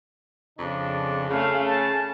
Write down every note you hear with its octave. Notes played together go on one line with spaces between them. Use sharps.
F2 C#3 D4
C#3 A3 C#4 F5
A5